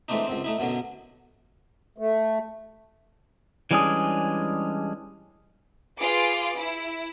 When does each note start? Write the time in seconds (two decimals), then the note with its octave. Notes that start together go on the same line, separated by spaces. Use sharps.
0.08 E3 G#3 A3 C4 D4 D#4
0.27 C#2 F#2 C4
0.44 A3 D#4 E4
0.58 F#2 B2 D3 F#3
1.98 A3
3.71 E3 G3 G#3 C#4 D4 G#4
5.97 F4 G#4 B4 D6
6.57 E4